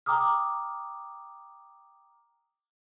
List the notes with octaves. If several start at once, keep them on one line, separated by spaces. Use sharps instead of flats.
G5 A#5 D6 D#6 F6